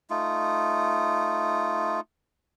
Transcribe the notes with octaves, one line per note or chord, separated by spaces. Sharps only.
A3 D#4 F4